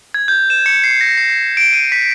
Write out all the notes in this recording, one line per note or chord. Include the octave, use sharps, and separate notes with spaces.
G#6
G6
E7
C#7
C7
A#6
C7
D7
D#7
B6